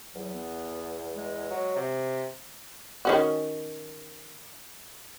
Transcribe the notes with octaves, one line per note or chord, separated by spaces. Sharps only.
E2 F#3
B3
G#3
F#3
C3
D#3 C#4 F#4